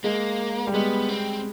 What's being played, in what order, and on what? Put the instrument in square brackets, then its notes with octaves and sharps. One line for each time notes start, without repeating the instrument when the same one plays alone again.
[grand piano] G#3 [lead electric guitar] A#3
[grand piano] G3
[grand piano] G#3 [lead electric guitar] B3
[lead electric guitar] C4